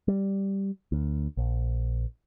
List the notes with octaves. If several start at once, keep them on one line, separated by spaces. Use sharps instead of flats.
G3
D2
A#1